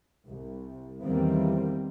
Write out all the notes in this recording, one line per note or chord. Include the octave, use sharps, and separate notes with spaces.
C2
E2 D#3 G3 A#3 C4